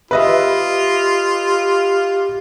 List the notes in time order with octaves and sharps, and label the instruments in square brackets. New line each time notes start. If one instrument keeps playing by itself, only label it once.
[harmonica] F4 [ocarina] G4 [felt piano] B4 D#5 E5